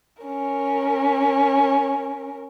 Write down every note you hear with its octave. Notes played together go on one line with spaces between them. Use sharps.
C#4 A#4